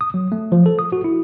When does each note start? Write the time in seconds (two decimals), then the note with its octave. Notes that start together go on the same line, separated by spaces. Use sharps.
0.01 D#6
0.14 F#3
0.32 A3
0.52 F3
0.66 A4
0.79 D#6
0.92 F#4
1.04 E4